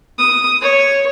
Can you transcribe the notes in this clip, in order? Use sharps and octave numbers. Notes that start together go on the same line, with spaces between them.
D#6
C#5